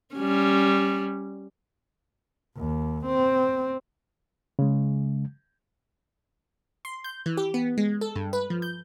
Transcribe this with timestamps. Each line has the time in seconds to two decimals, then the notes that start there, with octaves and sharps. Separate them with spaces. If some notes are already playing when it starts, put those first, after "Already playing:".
0.15 G3 C#4
2.57 D#2
3.06 C4
4.59 C#3 G#3
6.85 C6
7.04 G6
7.26 E3
7.37 G4
7.54 B3
7.78 G#3
8.01 A4
8.16 G2
8.33 B4
8.50 F3
8.62 G6